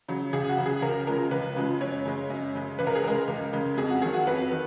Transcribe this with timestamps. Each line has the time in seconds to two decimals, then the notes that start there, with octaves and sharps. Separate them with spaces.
0.08 C#3 F#3
0.33 C#2 G#4
0.49 F#4
0.58 C#3 F#3
0.66 G#4
0.82 C#2 A#4
1.07 C#3 F3 G#3 A#4
1.31 C#2 B4
1.56 C#3 F3 G#3
1.81 F#2 C#5
2.05 C#3 G#3
2.30 F#2
2.55 C#3 G#3
2.79 C#2 B4
2.87 A#4
2.96 G#4
3.04 C#3 G#3 A#4
3.28 C#2
3.53 C#3 G#3
3.77 F2 G#4
3.90 F#4
4.02 D#3 F#3 G#4
4.14 F#4
4.27 F2 B4
4.52 D#3